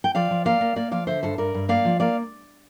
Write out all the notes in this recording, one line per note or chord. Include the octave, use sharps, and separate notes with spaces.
G5
F3 D5 F5
F3
A#3 D5 F5
A#3
A#3 D5 F5
F3 D5 F5
D3 C5 E5
G2 A4 C5
G2 A#4 D5
G2
A#3 D5 F5
F3
A#3 D5 F5